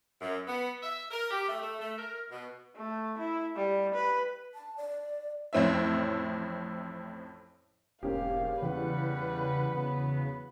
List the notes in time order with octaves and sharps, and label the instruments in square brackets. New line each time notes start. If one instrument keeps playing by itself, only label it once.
[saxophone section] F#2
B3
E5
A#4
G4
A3
A3
A3
A#4
B2
[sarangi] A3
E4
G3
B4
[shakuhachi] A5
D5
[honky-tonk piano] A1 F2 A2 C4 C#4 E5
[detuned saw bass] E1 [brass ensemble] G#2 [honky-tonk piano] A#3 C#4 G4 [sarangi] F5
[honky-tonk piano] E2 [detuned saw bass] C#3 [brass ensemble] E3 G3 F#5 [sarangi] B4
[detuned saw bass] C#3 [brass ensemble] F#3 B3